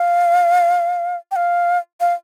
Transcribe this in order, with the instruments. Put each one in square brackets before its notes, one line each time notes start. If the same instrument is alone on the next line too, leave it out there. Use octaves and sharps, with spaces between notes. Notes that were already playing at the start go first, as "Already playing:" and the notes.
Already playing: [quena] F5
G5
F5
F5